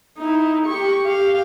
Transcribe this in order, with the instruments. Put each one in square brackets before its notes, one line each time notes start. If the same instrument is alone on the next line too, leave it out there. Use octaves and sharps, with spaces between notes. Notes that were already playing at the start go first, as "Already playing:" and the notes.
[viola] D#4 E4
G4 C#6
G4 F5